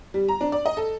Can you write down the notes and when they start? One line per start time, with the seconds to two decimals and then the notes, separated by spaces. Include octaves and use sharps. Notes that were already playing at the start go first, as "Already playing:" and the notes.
0.14 G3
0.28 A#5
0.41 D4
0.52 D5
0.66 D#5
0.77 A4